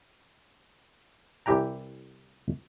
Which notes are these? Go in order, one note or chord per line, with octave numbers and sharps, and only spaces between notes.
C2 E3 G4 G5 A#5